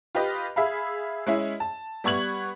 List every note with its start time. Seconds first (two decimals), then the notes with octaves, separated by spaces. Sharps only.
0.15 F4 G4 B4 D#5
0.56 G#4 E5 F5 B5
1.27 G#3 C#4 E4
1.60 A5
2.04 G3 B3 C#6 G#6 F#7